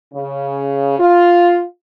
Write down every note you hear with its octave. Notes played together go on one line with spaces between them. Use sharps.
C#3
F4